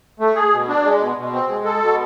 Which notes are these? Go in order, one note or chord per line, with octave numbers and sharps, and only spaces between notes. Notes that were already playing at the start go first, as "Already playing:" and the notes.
A3
G#4
B2
D4
G#3
B2
B2
C4
G#3
A4
B2